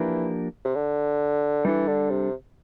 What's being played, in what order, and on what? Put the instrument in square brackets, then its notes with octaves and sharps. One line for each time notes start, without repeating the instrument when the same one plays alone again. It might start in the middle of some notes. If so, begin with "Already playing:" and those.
Already playing: [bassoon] E3 [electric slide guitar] F3 A#3 D4 G4 A#4
[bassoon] C3
D3
[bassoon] E3 [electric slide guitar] G3 D4 A4
[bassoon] D3
C3